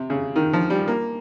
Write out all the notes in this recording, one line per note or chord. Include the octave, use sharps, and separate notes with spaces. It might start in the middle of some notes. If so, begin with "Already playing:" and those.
Already playing: C3
C#3
D#3
F3
G3
A#3